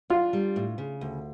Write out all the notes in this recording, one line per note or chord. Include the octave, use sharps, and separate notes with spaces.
D4 F4
G3
A2
C#3
D2